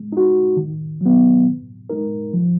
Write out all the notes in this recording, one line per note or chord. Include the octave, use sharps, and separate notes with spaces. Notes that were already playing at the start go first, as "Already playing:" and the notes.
Already playing: G#3
D#4 F#4
D#3
F#3 B3
B2
G#3 D#4 A#4
F3